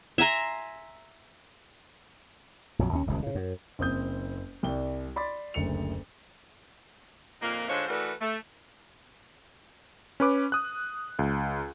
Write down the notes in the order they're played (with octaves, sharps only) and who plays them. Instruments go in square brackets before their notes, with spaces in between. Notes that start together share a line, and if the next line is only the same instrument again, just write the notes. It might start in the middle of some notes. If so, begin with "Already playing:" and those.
[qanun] E5 G#5 A#5 C6
[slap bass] A#1 F2 F3 F#3
D#2 C#4
D#1 C#2 F#2 C3
A2 C#3
F#2
[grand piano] F#1 C4 D#6 G6
C2 D5 G5 G7
D5 B5 C6 D6 A6
F#1 D2 C#7 F7
[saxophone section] F2 A#2 D#3 A#3
D3 G#3 D#4 F4 C5 C#5
E3 A3 F#4 A#4 B4 D5
A3
[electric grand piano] C#4 B4 D6
D#6 F#6
C#2